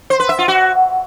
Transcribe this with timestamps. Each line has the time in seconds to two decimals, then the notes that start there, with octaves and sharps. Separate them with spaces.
0.10 C5
0.20 B4
0.29 E5
0.39 F4
0.48 F#4